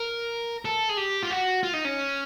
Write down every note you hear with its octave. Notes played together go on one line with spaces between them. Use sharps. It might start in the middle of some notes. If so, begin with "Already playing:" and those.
Already playing: A#4
A4
G#4
G4
F4
F#4
F4
D#4
C#4